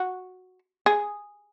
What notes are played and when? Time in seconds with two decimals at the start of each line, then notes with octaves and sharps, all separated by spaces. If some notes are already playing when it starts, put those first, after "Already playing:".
Already playing: F#4
0.86 G#4